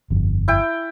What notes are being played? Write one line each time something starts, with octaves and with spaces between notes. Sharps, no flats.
G1 F2
E4 G5